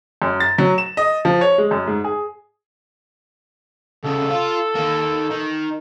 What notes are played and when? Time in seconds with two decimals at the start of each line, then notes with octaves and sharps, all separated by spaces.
0.22 F#2
0.40 A6
0.58 F#3
0.78 E7
0.97 D#5
1.25 F3
1.41 C#5
1.58 G#3
1.71 F#2
1.87 G#2
2.04 G#4
4.04 C2 C#3 A4
4.31 F4
4.75 D#3 A#3
5.31 D#3